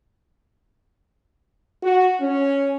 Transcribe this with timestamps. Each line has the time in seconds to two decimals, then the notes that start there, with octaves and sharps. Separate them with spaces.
1.82 F#4
2.20 C#4